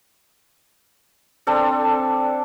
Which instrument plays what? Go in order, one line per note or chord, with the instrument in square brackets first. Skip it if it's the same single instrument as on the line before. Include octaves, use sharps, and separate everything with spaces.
[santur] C4 D4 A4